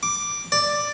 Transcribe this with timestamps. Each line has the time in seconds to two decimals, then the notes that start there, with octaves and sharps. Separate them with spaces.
0.03 D6
0.52 D5